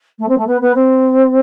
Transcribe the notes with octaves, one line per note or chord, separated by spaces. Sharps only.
A3
C4
A3
B3
B3
C4